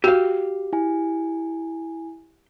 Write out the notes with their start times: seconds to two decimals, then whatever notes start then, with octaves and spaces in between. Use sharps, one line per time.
0.04 F#4 G4 F5
0.73 E4 G#5